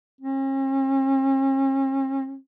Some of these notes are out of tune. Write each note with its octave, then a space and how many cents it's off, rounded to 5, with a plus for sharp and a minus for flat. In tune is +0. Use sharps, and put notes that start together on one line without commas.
C#4 -45